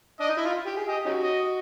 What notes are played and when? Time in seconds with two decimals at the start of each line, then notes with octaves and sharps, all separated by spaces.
0.20 D4 D#5
0.29 D#4
0.37 E4
0.46 F4
0.66 G4
0.77 G#4
0.88 G4 D#5
1.06 C#4 D#4 F#4
1.23 D#5